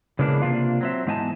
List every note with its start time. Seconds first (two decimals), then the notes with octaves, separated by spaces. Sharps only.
0.19 C#3 E3 G#3 A#3 B3 D4
0.42 C3 A#3 D4 F4 F5
0.81 F#3 C4 E5
1.06 G#2 E3 B3 D#4 G#5 A5